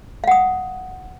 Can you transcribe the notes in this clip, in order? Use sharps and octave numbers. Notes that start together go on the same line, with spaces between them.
F5 F#5 D#6